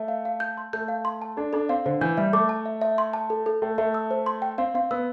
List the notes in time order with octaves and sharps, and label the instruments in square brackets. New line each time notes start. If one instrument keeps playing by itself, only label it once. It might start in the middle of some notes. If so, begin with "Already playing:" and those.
Already playing: [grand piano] A3 [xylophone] E5
[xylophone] F5
F5
G6
C6
[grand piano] A3 [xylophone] G6
[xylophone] F5
C6
A5
[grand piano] D4 [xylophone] A4
[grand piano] D4 [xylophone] A4
[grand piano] C4 [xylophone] F5
[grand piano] D3 [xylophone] C5
[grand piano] E3 [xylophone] G6
[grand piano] G3 [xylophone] E5
[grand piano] A3 [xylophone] D6
[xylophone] A5
E5
E5
C6
A5
A4
A4
[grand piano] A3 [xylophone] G5
[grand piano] A3 [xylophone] E5
[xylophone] E6
C5
C6
G5
[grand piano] C4 [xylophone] F5
[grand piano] C4 [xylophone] F5
[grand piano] B3 [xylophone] E6